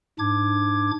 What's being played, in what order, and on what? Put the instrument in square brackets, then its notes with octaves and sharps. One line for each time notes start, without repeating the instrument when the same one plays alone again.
[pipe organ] G#2 D4 D6 G#6